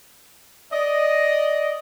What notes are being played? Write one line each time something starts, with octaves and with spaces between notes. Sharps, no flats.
D5 D#5